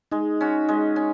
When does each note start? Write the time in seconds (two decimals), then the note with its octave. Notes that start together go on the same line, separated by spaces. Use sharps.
0.12 G#3 D#4
0.41 C#4 F#4
0.69 G#3
0.96 C#4